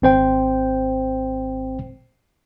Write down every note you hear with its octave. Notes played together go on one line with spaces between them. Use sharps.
G#1 C4 C5 G5